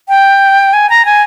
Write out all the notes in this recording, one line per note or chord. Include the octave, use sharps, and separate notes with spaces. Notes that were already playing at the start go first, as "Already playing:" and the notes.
G5
G#5
A#5
G#5